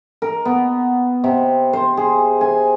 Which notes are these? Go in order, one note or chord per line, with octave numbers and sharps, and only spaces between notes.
A#4
B3
C3
C5
G#4
G#5